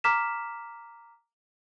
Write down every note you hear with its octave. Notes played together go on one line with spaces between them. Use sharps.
A#5 D6 F6 B6 E7